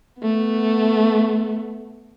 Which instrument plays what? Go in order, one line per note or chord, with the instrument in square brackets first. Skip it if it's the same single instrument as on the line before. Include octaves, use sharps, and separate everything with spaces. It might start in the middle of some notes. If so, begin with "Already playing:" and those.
[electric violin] A3 B3